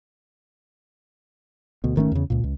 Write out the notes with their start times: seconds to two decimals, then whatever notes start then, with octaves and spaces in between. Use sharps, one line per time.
1.84 D2 B2
1.96 G#1 D#3 A3 C#4
2.12 E2 C#3
2.30 C#2 A#2
2.44 C#2